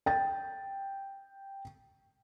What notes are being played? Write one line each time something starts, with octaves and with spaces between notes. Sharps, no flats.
G5 A6